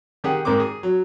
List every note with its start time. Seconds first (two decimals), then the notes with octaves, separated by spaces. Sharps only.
0.24 D#3 G4 G#4 F#5
0.45 G#2 A#3 C4 D6
0.60 G#4
0.83 F#3